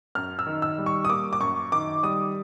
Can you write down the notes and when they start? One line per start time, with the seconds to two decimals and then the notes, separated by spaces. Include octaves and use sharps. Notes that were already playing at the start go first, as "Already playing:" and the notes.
0.15 F#2 F6
0.39 E6
0.46 D#3
0.62 E6
0.78 G3
0.86 C#6
1.05 D#6
1.10 A#3 D6
1.33 D6
1.40 F#2 C#6
1.72 D#3 D6
2.03 G3 D#6